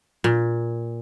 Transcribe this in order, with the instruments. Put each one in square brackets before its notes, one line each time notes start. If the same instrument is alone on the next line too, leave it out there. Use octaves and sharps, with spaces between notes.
[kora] A#2